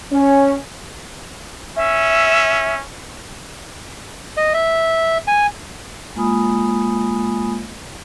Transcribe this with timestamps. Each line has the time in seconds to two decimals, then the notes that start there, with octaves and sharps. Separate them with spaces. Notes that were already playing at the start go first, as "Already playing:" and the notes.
0.12 C#4
1.76 C#4 E5
4.37 D#5
4.54 E5
5.28 G#5
6.16 G#3 A#3 F4 G#5 B5 D#6